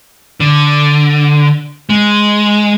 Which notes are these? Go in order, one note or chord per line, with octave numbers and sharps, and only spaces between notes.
D3
G#3